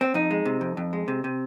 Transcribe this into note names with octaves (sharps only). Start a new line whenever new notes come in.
C4
F2 D#4
G#3
C3
F2
F2
G#3
C3
C3